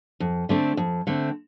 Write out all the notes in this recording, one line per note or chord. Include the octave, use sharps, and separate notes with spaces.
F2
D3 A3 C4
F2
D3 A3 C4